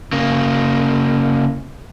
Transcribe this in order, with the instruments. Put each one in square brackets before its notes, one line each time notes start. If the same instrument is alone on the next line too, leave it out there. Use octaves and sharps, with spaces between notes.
[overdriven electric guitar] C#3 A#3